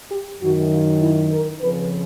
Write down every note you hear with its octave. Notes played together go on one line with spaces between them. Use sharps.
G4
F#2 D#3 F#4
F4
E4
A#4
F2 C#3 F3 B4